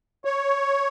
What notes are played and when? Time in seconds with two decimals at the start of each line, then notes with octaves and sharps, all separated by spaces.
0.25 C#5